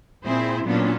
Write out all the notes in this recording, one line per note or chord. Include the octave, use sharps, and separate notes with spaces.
A#2 C4 E4 G#4 C5
A#2 F#3 B3 C#4 D4